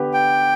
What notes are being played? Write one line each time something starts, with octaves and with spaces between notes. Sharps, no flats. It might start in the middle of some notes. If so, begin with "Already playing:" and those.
Already playing: D3 B3 G4 B4
G5